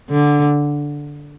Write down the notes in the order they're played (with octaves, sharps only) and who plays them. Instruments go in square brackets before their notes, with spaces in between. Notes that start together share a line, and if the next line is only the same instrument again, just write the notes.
[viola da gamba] D3